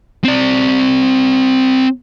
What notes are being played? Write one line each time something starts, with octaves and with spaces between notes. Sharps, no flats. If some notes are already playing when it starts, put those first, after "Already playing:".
C4 D5